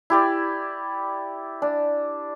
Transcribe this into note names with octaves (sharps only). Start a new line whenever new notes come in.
E4 G4 D5
D4